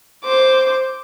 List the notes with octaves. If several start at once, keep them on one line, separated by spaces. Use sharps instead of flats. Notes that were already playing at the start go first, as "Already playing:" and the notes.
C5 D6